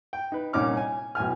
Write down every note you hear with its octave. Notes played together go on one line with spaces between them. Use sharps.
G5
D#4 B4
C2 A#2 C#4 D#4 D6 F6
G#5
B1 A2 G#5 F6